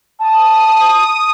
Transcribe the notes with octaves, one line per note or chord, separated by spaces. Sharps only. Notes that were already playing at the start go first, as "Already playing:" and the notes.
A5 D#6